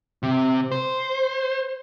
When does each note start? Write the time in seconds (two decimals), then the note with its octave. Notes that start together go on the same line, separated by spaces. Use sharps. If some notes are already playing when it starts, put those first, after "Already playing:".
0.23 C3
0.72 C5